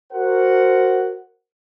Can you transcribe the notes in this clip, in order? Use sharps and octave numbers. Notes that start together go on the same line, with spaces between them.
F#4 A#4 C5 F#5